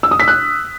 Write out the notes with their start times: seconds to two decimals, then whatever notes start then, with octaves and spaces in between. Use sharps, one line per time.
0.03 E6
0.11 D#6
0.20 B6
0.28 F#6